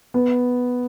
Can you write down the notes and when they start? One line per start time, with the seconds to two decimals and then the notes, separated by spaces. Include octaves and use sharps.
0.14 B3